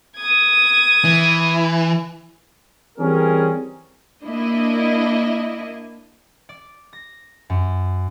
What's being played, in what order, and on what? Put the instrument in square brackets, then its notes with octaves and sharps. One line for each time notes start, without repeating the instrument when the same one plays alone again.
[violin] D#6 G#6
[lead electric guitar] E3
[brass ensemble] E3 G3 C4 C#4 G#4 A#4
[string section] A#3 D4 E4 D#5
[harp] D5
A#6
F#2